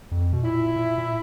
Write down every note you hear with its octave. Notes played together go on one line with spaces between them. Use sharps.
F2
B2
A#2 E4
A#2
A#2